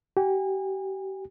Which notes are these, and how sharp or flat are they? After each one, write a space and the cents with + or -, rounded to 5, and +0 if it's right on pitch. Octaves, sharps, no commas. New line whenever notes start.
G4 -35 G#5 -35